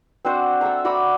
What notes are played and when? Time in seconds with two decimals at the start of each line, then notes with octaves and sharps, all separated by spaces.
0.25 C4 D4 F#4 C5
0.61 A4 E5 A#5
0.85 F#4 D5 A#5 B5